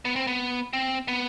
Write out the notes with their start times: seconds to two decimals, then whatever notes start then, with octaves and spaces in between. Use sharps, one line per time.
0.05 B3
0.16 C4
0.27 B3
0.73 C4
1.08 B3